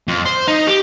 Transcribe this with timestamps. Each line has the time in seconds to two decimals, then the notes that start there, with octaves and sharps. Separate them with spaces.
0.08 F2
0.25 C5
0.48 D#4
0.67 G4